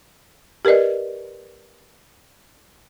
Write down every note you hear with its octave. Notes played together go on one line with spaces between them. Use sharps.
G4 A#4 B4 D5 D#5